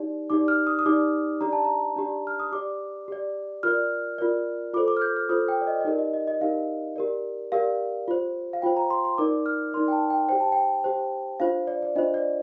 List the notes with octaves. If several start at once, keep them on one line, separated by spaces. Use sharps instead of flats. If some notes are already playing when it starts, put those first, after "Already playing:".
Already playing: D#4 G4 D5
D#4 G4 D5 D6
F6
D#6
D#6
D#4 G4 D5 D6
D4 G4 D5 A#5
A5
A#5
D4 G4 D5
F6
D#6
G4 D5 D6
G4 D5
F4 A#4 D5 F6
F4 A#4 D5
F4 A4 C5 D6
D6
F6
G6
F6
F4 A4 C5 D#6
G5
D5
D#5
D#5
D#4 G4 A#4 D5
D#5
D#5
D#5
D#4 G4 A#4 F5
G4 A#4 D5
G4 A#4 D5 F5
F4 C5
F5
F4 C5 G5
A#5
C6
C6
D#4 A#4 D5 D6
F6
D#4 A#4 D5 C6
G5
A5
G5
G4 C5 G5
A5
G5
G4 C5
D4 F4 C5 F5
D5
D5
D4 F4 C5 D#5
D5